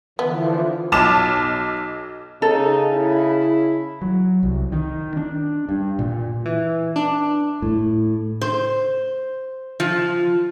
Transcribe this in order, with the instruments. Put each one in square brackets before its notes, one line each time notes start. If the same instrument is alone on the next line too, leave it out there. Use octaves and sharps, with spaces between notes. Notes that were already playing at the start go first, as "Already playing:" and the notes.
[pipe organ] D3 E3 F3 [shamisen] B3
[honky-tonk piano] B1 A5 D6 E7
[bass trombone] C#3 [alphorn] D#4 [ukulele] A4
[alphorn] E4
[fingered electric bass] F#3
C2
D#3
D4
G2
A#2
[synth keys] E3
D4
[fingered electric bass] A2
[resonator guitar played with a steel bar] C5
F3